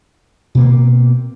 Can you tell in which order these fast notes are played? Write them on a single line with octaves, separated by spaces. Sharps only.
B2 A#3 C4